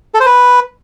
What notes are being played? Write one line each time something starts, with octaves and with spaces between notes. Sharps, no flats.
A4
C5
B4